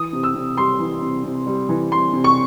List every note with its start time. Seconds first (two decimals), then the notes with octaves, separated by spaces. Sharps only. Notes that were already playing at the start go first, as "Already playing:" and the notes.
Already playing: E3 D#6
0.13 C3
0.23 E6
0.35 C3
0.57 G3 C6
0.79 E3
1.02 C3
1.24 C3
1.47 G3
1.69 E3
1.91 C3 C6
2.13 C3
2.24 C#6